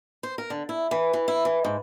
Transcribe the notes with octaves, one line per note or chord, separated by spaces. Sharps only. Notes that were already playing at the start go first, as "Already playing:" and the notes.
C5
A#4
D3
E4
E3
E3
E4
E3
G#2